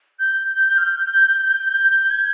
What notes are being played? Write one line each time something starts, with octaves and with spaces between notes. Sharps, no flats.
G6
F6
G6
G#6